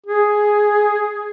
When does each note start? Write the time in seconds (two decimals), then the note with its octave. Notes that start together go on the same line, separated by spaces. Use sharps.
0.06 G#4